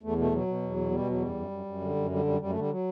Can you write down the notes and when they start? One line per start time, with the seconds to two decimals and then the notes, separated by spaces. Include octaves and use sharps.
0.03 E2 A3
0.18 B2 A3
0.32 B2 F#3
0.47 B2
0.62 E2
0.77 B2
0.92 B2 G3
1.07 E2 F#3
1.21 F#2 G3
1.36 F#2
1.51 F#2
1.65 F#2
1.81 D3
1.95 F#2
2.10 D3 G3
2.25 F#2 G3
2.40 F#2 G3
2.50 A3
2.55 D3 G3
2.70 F#3